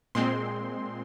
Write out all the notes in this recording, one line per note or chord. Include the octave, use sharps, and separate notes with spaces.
A#2 G#3 C4 C6